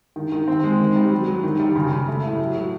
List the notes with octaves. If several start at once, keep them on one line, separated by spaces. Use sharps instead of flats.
D#3
D#3
C4
G#3
D#3
G3
F#3
F#3
D#3
G3
C#3
C#3
A3
A2
F#3
F#3